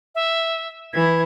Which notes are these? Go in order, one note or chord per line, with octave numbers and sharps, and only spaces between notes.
E5
E3 E4 G#6